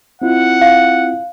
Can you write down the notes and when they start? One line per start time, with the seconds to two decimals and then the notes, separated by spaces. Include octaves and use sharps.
0.22 C4 E4 F4 F#5
0.61 F5